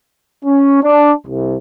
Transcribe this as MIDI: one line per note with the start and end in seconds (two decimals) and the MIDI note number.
0.45 0.79 61
0.83 1.12 62
1.26 1.57 36